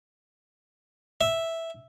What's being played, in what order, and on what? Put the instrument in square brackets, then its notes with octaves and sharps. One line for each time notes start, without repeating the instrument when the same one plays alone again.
[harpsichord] E5